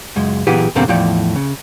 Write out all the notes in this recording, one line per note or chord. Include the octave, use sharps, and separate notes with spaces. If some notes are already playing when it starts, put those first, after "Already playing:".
C#2 F#2 G#3
A#2 E3 F#3 B3 G4 G#4
E2 G2 B2 D3 A#3 C4
E2 A2 F3 D5 G5
C#3